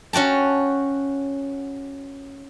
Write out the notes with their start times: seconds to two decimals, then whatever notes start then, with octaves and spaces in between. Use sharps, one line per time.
0.13 C#4 F#4 G5 A5